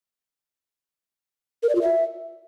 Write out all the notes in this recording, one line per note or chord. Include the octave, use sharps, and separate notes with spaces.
A#4
D5
F4
E5